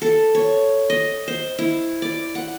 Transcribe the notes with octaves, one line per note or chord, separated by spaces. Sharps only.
A4
C#5
D#5
C5
E4
D5
F#5